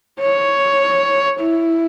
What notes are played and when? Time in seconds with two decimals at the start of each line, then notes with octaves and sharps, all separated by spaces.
0.20 C#5
1.40 E4